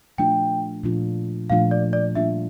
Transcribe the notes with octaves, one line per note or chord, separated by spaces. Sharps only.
A#2 F3 A3 D4 F4 G5
A#2 F3 A3 D4 F4
A#2 F3 A3 D4 F4 F5
D5
D5
G3 A#3 D4 F4 E5